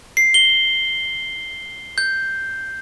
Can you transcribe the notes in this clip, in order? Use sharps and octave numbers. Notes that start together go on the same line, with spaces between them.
C7
G7
G6